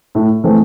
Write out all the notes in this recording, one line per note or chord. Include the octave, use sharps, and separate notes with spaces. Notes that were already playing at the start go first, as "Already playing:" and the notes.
A2
E3 A3 C4